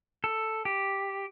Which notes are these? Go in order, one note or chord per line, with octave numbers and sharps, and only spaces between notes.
A4
G4